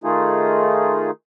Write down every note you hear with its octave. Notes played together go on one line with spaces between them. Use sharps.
D#3 A3 D#4 F4 G#4